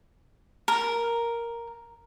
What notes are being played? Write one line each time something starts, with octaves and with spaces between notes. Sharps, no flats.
A#4